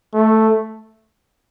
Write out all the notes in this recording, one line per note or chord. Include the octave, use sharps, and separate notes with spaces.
A3